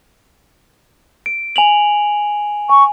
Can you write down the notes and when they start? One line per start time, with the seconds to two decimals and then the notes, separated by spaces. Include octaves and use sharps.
1.26 D7
1.56 G#5 F7 F#7
2.70 G#5 C#6